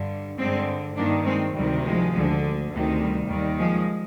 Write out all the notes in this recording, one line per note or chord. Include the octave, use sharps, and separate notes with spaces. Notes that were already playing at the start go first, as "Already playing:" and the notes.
Already playing: G2 D3
G2 D3 G#3 C4
G2 D#3 A#3 D4
G#3 C4
D2 C3 D#3 G3
F3 G#3
D2 D3
D2 C3 D#3
G3
D#2 D#3 G3
F3 G#3